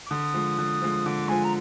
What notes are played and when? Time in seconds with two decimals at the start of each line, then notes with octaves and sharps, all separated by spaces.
0.06 D6
0.10 D3 D#6
0.34 F3 G#3
0.58 D3
0.82 F3 G#3
1.06 D3 D6
1.28 F3 G#3 G#5
1.44 A#5